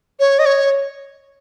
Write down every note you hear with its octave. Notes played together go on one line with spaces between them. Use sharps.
C#5
D#5
C#5